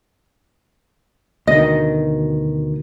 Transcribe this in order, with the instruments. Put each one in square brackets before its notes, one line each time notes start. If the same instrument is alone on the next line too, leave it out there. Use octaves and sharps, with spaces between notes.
[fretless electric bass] D2 B2 D#3 [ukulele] D#5